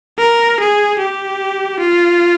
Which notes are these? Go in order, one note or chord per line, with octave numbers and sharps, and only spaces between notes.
A#4
G#4
G4
F4